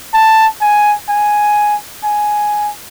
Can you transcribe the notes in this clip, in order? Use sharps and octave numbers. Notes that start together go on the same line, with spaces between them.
A5
G#5
G#5
G#5